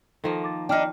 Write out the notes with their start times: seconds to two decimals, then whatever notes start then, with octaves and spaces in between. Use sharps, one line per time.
0.24 D#3 F3 A#3 A4
0.44 D6 A6
0.69 D4 D#4 G5 F6